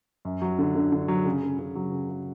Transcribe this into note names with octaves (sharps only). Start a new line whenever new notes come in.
F#2
F#3
D3
D3
D3
F#3
C#3
C#3
C#3
F#3
C#3
C#3